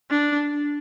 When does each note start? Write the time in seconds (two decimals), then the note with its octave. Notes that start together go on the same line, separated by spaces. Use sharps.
0.11 D4